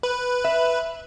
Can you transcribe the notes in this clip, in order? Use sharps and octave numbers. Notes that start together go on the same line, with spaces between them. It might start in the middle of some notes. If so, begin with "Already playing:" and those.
B4
E5